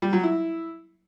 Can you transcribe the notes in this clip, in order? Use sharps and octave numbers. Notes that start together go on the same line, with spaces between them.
G3
F#3
E4